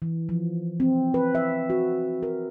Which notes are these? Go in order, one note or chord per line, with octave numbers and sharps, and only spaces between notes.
E3
F3
C4
B4
E5
F#4
A#4